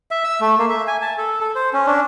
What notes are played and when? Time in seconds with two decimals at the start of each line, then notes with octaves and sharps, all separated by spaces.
0.11 E5
0.24 E6
0.41 A3
0.58 A#3
0.70 E5
0.88 G#5
1.02 A5
1.18 A4
1.41 A4
1.55 C5
1.73 C#4
1.87 D4